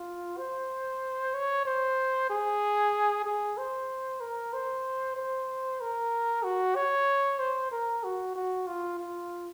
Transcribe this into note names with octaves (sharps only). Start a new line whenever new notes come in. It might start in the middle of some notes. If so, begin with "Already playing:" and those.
Already playing: F4
C5
C#5
C5
G#4
G#4
C5
A#4
C5
C5
A#4
F#4
C#5
C5
A#4
F#4
F#4
F4
F4